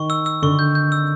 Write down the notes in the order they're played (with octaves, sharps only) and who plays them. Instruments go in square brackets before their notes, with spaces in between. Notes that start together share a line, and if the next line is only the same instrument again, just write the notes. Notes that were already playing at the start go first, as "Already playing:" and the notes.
Already playing: [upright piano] D#3 [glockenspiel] C#6
[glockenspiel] E6
E6
[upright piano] D3 [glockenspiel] C#6
[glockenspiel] G6
G6
E6